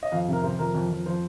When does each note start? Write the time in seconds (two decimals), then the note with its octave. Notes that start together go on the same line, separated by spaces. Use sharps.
0.03 D#5
0.12 F2 F5
0.28 C3 A#4
0.44 C3 C5
0.59 F2 A#4
0.74 F2
0.90 F2
1.06 F3 C5